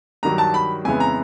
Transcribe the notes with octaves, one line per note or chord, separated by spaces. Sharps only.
G2 D#3 F#3 A#5
A5
B5
F2 C#3 E3 G#3 B3 G#5
A#5